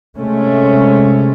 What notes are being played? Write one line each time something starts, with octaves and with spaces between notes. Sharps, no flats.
C3 G#3 A3 C#4